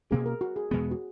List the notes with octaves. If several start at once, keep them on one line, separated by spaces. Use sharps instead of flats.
B2 A#3 C#4 G#4
A#4
F#4
G#4
E2 B2 G#3 B3 G#4
F#4